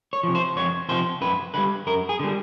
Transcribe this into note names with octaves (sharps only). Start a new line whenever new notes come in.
C#5
C3 F3
C5
F2 C#5
C3 F3 C5
F#2 B4
D3 G3 B4
F#2 A#4
G#4
D3 G3